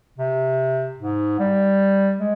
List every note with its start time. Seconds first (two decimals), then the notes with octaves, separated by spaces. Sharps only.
0.18 C3
0.98 G#2
1.39 G3
2.20 G#3